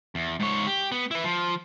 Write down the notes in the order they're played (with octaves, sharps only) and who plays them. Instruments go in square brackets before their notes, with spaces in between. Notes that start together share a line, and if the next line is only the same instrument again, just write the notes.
[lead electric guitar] E2
G#2 C#5
G4
B3
E4 B4
F3